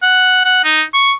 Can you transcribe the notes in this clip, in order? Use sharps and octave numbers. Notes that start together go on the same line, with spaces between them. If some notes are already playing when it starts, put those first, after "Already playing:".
F#5
F#5
D#4
C#6